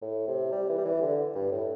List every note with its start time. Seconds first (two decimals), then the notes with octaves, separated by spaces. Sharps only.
0.02 A2
0.28 C3
0.52 G3
0.69 E3
0.78 G3
0.85 E3
1.02 D3
1.35 G2
1.52 A2